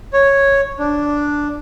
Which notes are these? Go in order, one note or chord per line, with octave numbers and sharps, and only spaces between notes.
C#5
D4